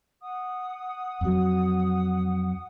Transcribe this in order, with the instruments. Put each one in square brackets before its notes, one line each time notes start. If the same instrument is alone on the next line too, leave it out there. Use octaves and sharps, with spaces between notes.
[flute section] F#5 D#6
[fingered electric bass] F2 F#3